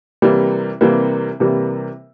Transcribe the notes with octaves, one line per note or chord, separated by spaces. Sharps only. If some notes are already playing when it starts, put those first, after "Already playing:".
C3 E3 G3 A#3
C3 E3 G3 A#3
C3 E3 G3 A#3